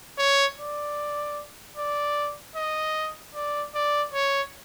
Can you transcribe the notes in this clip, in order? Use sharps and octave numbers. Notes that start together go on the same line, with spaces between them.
C#5
D5
D5
D#5
D5
D5
C#5